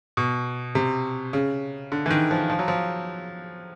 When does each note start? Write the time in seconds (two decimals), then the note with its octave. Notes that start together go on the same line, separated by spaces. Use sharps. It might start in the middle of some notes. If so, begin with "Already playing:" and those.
0.17 B2
0.75 C3
1.33 C#3
1.92 D3
2.06 E3
2.11 D#3
2.31 F3
2.50 F3
2.59 F#3
2.68 F3